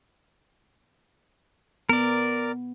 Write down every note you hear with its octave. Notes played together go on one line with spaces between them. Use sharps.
B3 A#4 D5